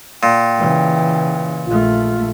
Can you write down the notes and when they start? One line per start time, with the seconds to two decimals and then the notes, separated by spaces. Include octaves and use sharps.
0.23 A#2 G5
0.58 C#3 E3
1.66 A#1 A3 F4